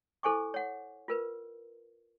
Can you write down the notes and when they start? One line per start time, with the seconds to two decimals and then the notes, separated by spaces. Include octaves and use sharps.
0.23 E4 A4 C5 G#5 C#6 D6
0.54 C#5 F#5
1.08 F4 A#4 B4